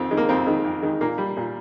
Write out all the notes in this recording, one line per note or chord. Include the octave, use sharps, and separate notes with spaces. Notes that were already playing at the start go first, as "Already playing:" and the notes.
Already playing: F2 D#3 C4
D#3 G#3
A#3
F2 C4
D#3 G#3
F2
D#3 G#3
A#2 A#3
G3
A#2